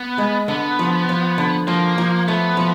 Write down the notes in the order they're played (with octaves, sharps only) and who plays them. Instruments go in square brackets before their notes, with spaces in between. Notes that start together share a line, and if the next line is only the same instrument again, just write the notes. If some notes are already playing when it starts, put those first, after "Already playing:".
Already playing: [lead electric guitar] B3
[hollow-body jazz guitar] G#3
[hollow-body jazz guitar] D3 [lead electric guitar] B3
[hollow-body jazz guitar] F3
F3
D3
[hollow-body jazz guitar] F3 [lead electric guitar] A#3
[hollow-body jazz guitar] F3
[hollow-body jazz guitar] A3 [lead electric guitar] B3
[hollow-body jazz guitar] F3